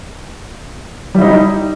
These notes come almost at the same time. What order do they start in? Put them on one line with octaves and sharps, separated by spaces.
G3 E4 D#4